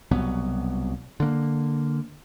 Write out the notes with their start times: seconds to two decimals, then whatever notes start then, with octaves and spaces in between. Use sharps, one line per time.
0.11 C2 B2 F#3 B3
1.20 D3 A#3